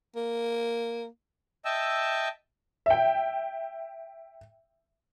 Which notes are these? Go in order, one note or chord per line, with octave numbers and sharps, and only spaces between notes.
A#3
D#5 E5 G5 A5 E6
E5 G5